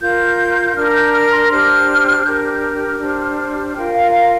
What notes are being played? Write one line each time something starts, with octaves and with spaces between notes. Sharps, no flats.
F4 A#4 G6
D4 A#4 F6
F6
G6
F6
C6
D4 G4 C5 F6
D4 G4 A#4 G6
F6
D4 G4 C5
F4 A#4 G5
F5
F5